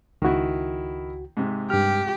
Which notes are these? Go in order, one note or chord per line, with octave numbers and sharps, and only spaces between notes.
C#2 D#3 E4 F#4
G#2 C3
G2 G4 F6